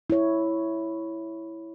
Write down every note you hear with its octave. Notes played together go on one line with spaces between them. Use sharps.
E4 C#5